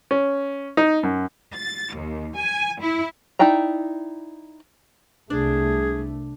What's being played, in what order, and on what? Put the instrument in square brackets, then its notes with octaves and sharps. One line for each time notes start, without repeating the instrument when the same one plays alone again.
[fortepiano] C#4
D#4
F#2
[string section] A6
D#2
G#5
E4
[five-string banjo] D#4 E4 D5 G5 A#5
[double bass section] C2 A3 [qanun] D4 [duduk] G#4